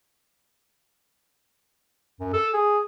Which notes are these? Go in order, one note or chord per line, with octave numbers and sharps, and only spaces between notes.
F#2
A4
G#4